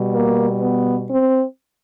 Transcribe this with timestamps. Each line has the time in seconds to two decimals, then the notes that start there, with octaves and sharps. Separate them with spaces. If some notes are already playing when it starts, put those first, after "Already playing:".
Already playing: B2 G3
0.12 A#3
0.60 B3
1.08 C4